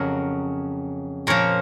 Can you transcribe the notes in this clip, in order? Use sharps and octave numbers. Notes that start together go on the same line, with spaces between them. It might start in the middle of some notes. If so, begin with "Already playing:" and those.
Already playing: F2 C#3 F#3 A#4 C#5
A#2 F3 A#4 C#5